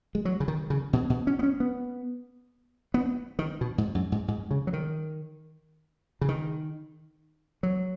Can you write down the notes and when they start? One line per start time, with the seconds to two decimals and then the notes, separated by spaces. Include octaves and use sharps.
0.15 G#3
0.25 F#3
0.40 C#3
0.48 D#3
0.70 C#3
0.93 B2
1.10 B2
1.27 C#4
1.39 B3
1.43 C#4
1.60 B3
2.94 B3
3.39 D#3
3.61 B2
3.78 G#2
3.95 F#2
4.12 G#2
4.28 G#2
4.51 C#3
4.67 F#3
4.73 D#3
6.21 C#3
6.29 D#3
7.63 F#3